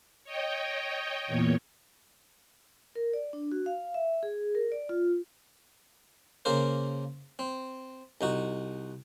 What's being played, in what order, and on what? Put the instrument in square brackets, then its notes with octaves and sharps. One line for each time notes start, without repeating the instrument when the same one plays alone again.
[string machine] C#5 D#5 G5
E2 A#2 C#5
[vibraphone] A#4
D5
D4
F#4
F5
E5
G#4
A#4
D5
F4
[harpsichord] C#3 A#3 A#4 C5
C4
C2 D#4 F#4